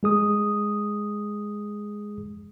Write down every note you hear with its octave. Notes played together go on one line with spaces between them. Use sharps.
G#3 G#4 D#6